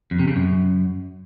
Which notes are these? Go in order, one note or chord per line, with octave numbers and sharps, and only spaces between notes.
F2
C3
C#3
F#2